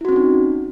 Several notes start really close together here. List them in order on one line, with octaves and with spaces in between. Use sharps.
E4 F#4 C4 C#4 D#4